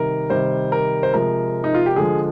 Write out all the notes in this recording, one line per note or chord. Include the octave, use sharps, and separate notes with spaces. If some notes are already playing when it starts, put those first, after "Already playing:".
Already playing: C3 D#3 G3 A#4
C3 D#3 G3 C5
A#4
C5
C3 F3 G#3 A#4
D#4
F4
G4
D3 F3 G#3 G#4